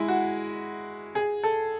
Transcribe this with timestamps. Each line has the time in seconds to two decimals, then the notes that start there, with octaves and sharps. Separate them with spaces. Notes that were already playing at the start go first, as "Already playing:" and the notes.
Already playing: G#3 E4
0.08 F#4
1.15 G#4
1.43 A4